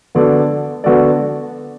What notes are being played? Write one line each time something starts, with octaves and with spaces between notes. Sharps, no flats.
D3 B3 F#4 A4 D5
D3 B3 F#4 A4 D5